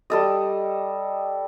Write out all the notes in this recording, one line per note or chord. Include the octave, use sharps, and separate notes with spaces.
G3 A4 D#5